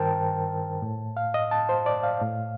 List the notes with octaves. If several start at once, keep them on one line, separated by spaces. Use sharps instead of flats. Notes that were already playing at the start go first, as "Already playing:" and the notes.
Already playing: G2 D#3 A#4 C5 G5 A5
A2
F5
D#5
A5
C5
D5
F5
A2